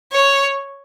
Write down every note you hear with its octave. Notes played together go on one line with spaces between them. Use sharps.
C#5